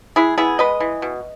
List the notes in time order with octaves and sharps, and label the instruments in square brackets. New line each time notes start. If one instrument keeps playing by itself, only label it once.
[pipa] G#3 E4 G#4
B3 E4 G#4
G#3 B4 D#5
E3
B2